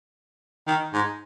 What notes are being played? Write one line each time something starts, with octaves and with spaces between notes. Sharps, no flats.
D#3
G#2